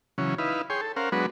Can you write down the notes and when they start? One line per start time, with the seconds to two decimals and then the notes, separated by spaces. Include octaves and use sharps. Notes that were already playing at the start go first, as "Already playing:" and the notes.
0.18 C#3 E3 F#3 C#4
0.38 D#4 E4 B4 F5
0.70 G#4 C#5 G5 C6
0.81 A4
0.96 C#4 A#4 C5 F5 F#5
1.12 F#3 G#3 B3 D4 F#4 B4